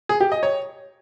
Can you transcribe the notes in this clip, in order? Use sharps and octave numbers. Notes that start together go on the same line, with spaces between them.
G#4
G4
D#5
C#5